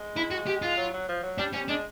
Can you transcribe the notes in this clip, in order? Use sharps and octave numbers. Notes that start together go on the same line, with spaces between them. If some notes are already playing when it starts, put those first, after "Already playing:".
Already playing: G#3
E4
F#4
G4
F4
F#3
F#3
F3
F#3
G3 D4
G3 C#4
G#3 D4